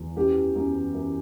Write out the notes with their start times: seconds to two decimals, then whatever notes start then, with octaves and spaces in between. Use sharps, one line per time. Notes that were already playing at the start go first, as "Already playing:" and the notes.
Already playing: E2
0.16 F#2 G4
0.55 F#2
0.94 F#2